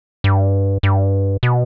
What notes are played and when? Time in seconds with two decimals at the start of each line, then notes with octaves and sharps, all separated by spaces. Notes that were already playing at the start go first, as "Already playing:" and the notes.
0.24 G2
0.83 G2
1.43 B2